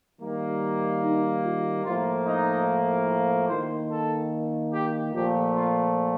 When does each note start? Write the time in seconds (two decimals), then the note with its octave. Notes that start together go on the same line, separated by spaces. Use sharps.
0.20 D#3 G3 A#3
1.02 D#4
1.44 F4
1.84 A2 F3 A#3 F4
2.25 D#4
3.48 D#3 A#3 C5
3.89 A4
4.73 G4
5.13 A#2 F3 A3 G4
5.54 F4